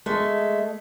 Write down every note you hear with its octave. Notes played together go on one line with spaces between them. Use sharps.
G#3 A3